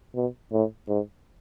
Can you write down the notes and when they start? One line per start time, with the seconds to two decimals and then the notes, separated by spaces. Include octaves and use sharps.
0.15 B2
0.52 A2
0.88 G#2